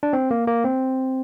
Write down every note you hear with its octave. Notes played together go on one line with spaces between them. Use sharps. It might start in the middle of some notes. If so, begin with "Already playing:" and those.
D4
C4
A#3
A#3
C4